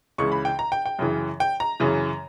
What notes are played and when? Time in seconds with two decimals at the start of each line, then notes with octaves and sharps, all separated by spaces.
0.18 C#2 C#3 E3 C#6
0.32 B5
0.45 G5
0.59 A#5
0.72 G5
0.86 G5
0.99 F#2 C#3 E3
1.40 G5
1.60 A#5
1.80 F#2 C#3 E3